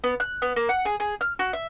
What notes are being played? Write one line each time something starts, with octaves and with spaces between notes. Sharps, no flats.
B3
F#6
B3
A#3
F#5
G#4
G#4
F6
F#4
E5